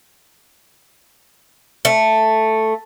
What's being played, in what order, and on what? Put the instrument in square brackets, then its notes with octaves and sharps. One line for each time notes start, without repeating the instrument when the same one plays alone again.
[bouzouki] A3